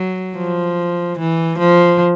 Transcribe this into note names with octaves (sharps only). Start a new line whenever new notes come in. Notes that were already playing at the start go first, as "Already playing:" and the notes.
Already playing: F#3
F3
E3
F3